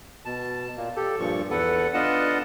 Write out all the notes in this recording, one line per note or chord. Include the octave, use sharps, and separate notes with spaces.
B2 A5
A#2 A#3
G4 A4
G2 A#2 F3 C#6
E2 A4 B4 F#5
B3 D4 F4 D#5 F#5 A5